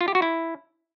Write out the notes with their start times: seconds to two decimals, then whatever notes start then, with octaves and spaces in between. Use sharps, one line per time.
0.01 F4
0.08 G4
0.15 F#4
0.22 E4